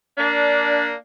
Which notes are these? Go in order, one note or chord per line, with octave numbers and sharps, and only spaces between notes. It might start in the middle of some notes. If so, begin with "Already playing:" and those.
A#3 D4